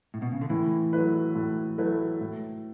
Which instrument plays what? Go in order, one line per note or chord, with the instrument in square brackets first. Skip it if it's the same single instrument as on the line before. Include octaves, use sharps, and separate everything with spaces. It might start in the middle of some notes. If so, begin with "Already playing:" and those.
[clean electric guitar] A2
B2
C#3
D3
[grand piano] A2 [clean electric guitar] E3
[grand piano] F#3 A3 E4 B4
A2
F#3 A3 E4 B4
A2